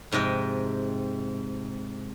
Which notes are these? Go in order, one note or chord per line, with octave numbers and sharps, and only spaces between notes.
F2 G#2 C3 D#5 G5